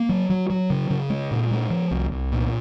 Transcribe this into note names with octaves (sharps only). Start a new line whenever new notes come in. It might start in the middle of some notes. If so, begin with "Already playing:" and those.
Already playing: A#3
F#3
F#3
F#3
C#3
C#3
G#3
A#2
G#3
F3
C2
C2
A#2